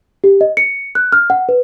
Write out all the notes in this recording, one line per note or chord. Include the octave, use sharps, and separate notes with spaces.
G4
D#5
C#7
F#6
F6
F#5
B4